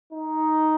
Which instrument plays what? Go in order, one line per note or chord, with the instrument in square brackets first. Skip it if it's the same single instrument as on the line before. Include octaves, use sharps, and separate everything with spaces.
[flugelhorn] D#4